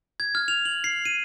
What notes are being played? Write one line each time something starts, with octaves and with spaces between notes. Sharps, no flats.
G#6
F6
F7
F#7
C7
D#7